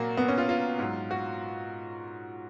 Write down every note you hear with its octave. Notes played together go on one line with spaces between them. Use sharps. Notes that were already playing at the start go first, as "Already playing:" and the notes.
Already playing: A#2 F#3 A#3 F#4
B3
C#4
F4
F4
G#2 F#3
F#4